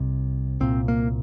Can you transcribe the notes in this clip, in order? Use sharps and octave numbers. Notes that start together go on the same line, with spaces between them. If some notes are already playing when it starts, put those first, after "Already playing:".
Already playing: C2 C3
C2 A#2 C4
A#3